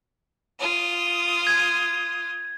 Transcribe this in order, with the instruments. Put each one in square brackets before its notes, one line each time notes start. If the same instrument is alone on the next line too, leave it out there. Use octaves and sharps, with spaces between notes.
[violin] F4 D#6
[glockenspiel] G#6